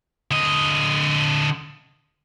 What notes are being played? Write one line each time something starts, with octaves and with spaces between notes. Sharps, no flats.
D3 D#5